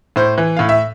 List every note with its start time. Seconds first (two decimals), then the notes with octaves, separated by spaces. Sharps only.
0.16 A2 C5
0.38 E3
0.57 A2 F5
0.69 E5